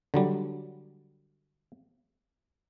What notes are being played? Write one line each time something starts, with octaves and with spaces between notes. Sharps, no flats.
D3 F#3 G3